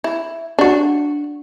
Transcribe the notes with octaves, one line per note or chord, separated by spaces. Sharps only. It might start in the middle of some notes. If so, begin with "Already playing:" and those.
E4
D4 F#4